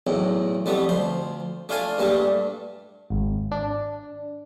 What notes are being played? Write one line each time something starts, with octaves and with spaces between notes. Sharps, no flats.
B1 E2 A2
F2 G3 A3 B3
D2 F3 C5
A3 D4 F4 F5 G#5 A5
G2 A#2 G3 A3 D4
G#1
D4